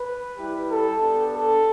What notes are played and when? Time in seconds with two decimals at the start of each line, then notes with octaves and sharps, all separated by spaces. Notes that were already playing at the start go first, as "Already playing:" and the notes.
Already playing: B4
0.37 G3 E4 G4
0.69 A4
1.01 B3 D4 G4
1.33 A4